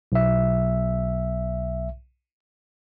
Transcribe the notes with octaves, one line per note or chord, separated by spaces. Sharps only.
B1 E5